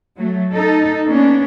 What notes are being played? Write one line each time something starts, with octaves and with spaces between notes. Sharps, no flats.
F#3 A3
D#4 A4
A#3 B3 C#4 D4